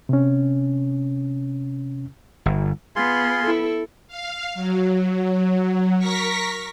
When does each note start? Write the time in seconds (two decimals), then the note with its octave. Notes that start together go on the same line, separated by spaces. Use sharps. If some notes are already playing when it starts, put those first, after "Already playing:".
0.09 C3 C#4
2.46 G1
2.96 B3 F4 G#4 C6
3.43 E4 A4
4.08 F5
4.54 F#3
5.98 A#4 C#6 A#6 B6